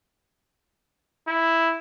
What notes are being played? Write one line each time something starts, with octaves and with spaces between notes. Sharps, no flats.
E4